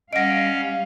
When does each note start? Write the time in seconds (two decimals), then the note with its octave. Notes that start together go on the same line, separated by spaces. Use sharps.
0.13 G3 C#4 D#5 F5 F#5 A#6 D7